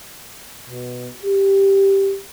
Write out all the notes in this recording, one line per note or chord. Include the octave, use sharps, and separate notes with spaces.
B2
G4